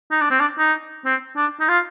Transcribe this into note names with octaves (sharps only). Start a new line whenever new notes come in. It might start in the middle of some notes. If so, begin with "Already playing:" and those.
D#4
D4
C4
D4
D#4
C4
D4
D#4
F4